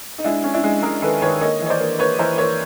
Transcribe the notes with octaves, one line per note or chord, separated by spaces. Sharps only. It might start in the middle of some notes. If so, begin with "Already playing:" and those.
D#4
G#3 D4 E4
C#4
D4 E4
G#3
G#3 G#4 A#4
D#3 A4 B4
D#3 B4 C#5
A#3 C#5 D#5
E3
C#5
C5 D5
A#3
A#3 B4 C#5
E3 A#4 C5
A#3 B4 C#5